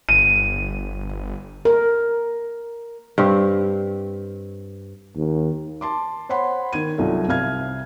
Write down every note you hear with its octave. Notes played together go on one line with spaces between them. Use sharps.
G1 D#7
A#4
G2 C4 G4
D#2
A5 C6 D6
C5 C#5 F#5 B5 C6
D#3 G#6 D#7
C2 F#3 D#4 F4 A4
C2 C3 F5 F6 G#6